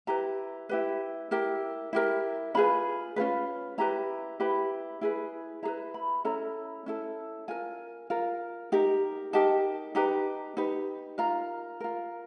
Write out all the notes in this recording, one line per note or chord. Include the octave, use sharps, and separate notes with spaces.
E4 G4 B4 A#5
E4 G4 B4
E4 G4 A#4
E4 G4 A#4
C#4 F4 G#4 B4 B5
C#4 F4 G#4 B4
E4 G4 B4 A#5
E4 G4 B4 B5
E4 G#4 B4
E4 G#4 A#5
B4
B5
C#4 E4 A4 A#5
C#4 E4 A4
F4 A#4 G#5
F4 A#4
D#4 G4 A#4
D#4 G4 A#4 A5
D#4 G4 B4 A#5
D#4 G4 B4
F4 A#4 A#5
F4 A#4